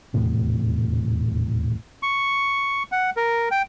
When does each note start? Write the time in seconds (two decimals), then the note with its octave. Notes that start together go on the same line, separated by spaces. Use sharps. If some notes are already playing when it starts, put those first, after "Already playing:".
0.14 D#1 E2 A2 C3
2.03 C#6
2.92 F#5
3.17 A#4
3.51 G5